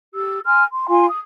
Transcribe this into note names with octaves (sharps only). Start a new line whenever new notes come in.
G4 E6
G#5 C6 F6
C6
F4 F5 G#5 C6
D#6